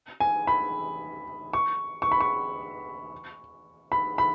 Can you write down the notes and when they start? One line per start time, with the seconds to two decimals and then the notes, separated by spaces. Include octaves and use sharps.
0.20 G#5
0.47 B5
1.53 C#6
2.02 C#6
2.12 B5
2.20 C#6
3.92 B5
4.18 B5